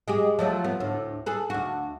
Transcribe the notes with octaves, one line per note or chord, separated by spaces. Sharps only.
G#3 G4 G#4
F3 F#3 A3
B3
D2 A2
G#4 A4 B4
D2 F#4